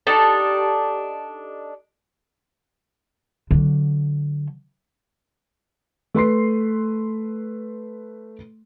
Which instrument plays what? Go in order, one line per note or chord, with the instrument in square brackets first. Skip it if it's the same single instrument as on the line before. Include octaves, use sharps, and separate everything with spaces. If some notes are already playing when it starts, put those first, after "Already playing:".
[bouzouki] D4 D#4 G4 A4
[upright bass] D3 F#3
[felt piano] A3 B4 C6 C7